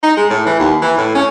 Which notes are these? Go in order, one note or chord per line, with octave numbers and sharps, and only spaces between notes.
D#4
G#3
A2
E3
D#2
E3
A2
C#4